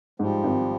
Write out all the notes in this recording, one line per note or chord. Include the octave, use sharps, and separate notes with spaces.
G#2 F3 G3
G#1